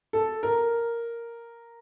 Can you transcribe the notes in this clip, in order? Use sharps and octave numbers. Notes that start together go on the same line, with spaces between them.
A4
A#4